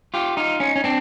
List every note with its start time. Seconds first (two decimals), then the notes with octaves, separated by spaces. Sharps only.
0.14 F4 G4
0.37 D#4 F4
0.60 C#4 D#4
0.76 C#4
0.84 C4 D4